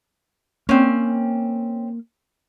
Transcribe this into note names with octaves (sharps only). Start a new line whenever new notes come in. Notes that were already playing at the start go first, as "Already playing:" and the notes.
A#3 C4 C#4